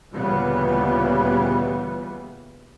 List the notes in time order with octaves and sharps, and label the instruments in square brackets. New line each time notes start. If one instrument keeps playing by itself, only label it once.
[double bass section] D2 A#2 C#3 E3 G3 B3